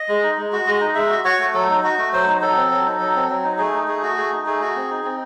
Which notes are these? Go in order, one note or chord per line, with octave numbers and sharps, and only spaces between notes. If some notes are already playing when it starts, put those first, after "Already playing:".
Already playing: D#5
G#3
D#4
G#3
F#4
G#3 D#5
D#4
G#3 E5
F#4
F#4 C#5
A3
F#3 A4
D#4
F#4
A3
F#3 C5
D#4
F#3 A4
C4
F#3
D#4
F#3
C4
F#3
D#4
A3 G#4
D#4
A3 G#4
F#4
A3 G#4
D#4
A3 G#4
F#4
C4
D#4
C4